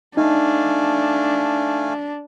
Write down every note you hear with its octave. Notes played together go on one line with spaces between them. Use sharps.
A3 D4 D#4 F5 G#5